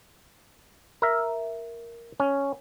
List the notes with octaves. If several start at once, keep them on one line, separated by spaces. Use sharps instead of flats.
A#4 E5
C#4